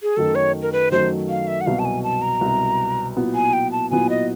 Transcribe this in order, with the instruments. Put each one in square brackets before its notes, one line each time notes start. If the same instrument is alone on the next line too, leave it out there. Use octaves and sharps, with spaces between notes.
[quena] G#4
[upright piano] F#2 D#3 F#3 A3 [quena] A4
[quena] C#5
A#4
B4
[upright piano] F#2 D#3 F#3 A3 [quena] C5
[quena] F5
E5
F#5
[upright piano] C2 B2 F#3 [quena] F5
[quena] A5
G#5
A5
A#5
[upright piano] C2 B2 F#3
A#2 F#3 B3 E4
[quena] G#5
G5
A5
[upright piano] A#2 F#3 B3 E4 [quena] G#5
[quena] D#5